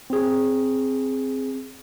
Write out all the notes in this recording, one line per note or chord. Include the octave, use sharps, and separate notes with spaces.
C4 G#4